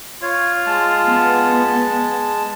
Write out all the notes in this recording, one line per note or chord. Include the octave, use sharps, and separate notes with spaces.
F4 C#5
G#3 A5
B3